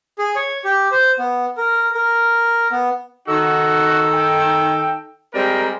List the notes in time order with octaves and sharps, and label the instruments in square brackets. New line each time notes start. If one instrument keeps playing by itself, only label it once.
[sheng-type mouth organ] G#4
C#5
G4
C5
B3
A#4
A#4
B3
[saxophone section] D#3 D#4 A4 [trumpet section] F#4
[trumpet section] G5
[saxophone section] G3 G#3 C4 [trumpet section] A#4